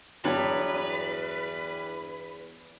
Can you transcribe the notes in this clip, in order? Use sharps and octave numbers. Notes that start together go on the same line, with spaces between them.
E2 G2 F#3 B3 B4